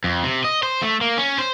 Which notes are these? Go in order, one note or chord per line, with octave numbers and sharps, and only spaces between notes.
F2
C3
D#5
C5
A3
A#3
C#4
C5